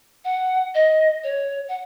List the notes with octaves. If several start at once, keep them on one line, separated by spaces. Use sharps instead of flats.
F#5
D#5
C#5
F#5